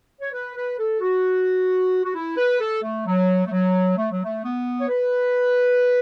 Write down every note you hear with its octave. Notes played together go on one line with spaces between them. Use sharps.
C#5
B4
B4
A4
F#4
F#4
E4
B4
A4
A3
F#3
A3
F#3
A3
F#3
A3
B3
C#5
B4